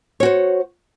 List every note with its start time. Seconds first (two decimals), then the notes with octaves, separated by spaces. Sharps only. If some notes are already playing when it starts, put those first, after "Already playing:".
0.20 C#5
0.23 F#4
0.25 C5